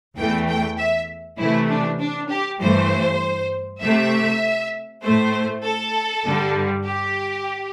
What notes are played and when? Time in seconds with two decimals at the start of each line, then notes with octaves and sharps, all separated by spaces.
0.17 E2 E3 A3 G5
0.48 G5
0.78 E5
1.38 C3 E3 A3 E4
1.68 D4
1.99 D4
2.29 G4
2.60 G2 E3 A3 C5
3.81 C3 A3 E5
5.03 A2 A3 C5
5.64 A4
6.25 G2 D3 G3
6.86 G4